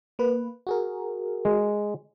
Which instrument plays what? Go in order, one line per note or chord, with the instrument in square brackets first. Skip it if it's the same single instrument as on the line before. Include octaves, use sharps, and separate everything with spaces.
[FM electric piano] A#3 B4
F#4 G#4 A#4
[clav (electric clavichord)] G#3